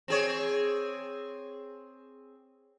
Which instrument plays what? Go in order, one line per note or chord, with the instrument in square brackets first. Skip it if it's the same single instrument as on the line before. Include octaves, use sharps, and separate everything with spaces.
[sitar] C4 G#4 C#5